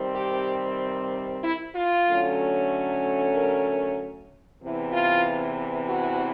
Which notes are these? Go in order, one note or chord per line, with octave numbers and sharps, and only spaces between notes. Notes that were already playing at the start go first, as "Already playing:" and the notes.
Already playing: C3 D#3 G3 C4
G4
E4
F4
D3 F#3 A3 C#4
A#4
E2 C3 E3
F4
F#4